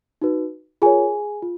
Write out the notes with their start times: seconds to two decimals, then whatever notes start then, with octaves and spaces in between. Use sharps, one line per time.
0.22 D#4 F#4 B4
0.82 F4 G#4 A#4 C#5 G#5
1.42 F4